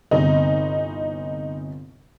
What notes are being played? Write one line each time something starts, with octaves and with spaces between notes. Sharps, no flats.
G1 C3 D#4